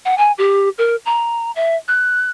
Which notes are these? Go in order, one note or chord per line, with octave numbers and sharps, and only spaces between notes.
F#5
G#5
G4
A#4
A#5
E5
F#6